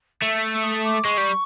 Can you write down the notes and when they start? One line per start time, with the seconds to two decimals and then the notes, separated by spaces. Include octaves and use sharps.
0.22 A3 E6
0.54 E6
0.63 D#6
0.84 D6
1.04 G#3 C#6
1.17 G3